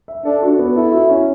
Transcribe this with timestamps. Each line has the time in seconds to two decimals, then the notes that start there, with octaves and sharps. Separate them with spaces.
0.08 E5
0.25 D4 A4
0.43 F#4
0.59 B3
0.76 E4 A4
0.92 F#4
1.10 C#4